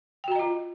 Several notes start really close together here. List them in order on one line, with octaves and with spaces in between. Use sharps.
G5 F#4 A#5 D#5 F4